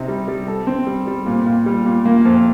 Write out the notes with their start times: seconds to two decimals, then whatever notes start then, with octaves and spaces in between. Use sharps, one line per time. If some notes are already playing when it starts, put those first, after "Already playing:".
Already playing: C3 D#4
0.08 G3
0.28 G3
0.48 A4
0.67 C4
0.87 G3
1.07 G3
1.26 A#2
1.46 A#2
1.66 G3
1.86 A#2
2.05 A#3
2.25 F2